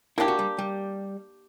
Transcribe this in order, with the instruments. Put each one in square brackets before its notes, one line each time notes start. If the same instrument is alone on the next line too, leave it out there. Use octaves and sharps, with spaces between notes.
[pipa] A#3 D4 G4 [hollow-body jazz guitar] E4
[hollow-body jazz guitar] F#4
G3
G3